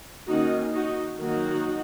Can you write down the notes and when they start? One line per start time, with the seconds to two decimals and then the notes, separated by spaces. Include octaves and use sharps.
0.27 D#3 A#3 C#4 D#4 F#4
0.74 D#4 F#4
1.19 D#3 F#3 A#3 D#4 F#4